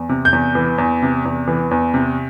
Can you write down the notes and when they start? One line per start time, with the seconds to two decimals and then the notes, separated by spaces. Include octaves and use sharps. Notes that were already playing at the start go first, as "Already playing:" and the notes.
Already playing: E2
0.09 C3
0.25 G6
0.33 E2
0.55 E3
0.78 E2
1.02 C3
1.25 E2
1.48 E3
1.71 E2
1.94 C3